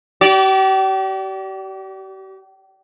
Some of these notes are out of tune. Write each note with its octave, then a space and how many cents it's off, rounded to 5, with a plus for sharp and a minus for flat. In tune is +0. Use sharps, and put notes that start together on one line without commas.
G4 -40 D5 -15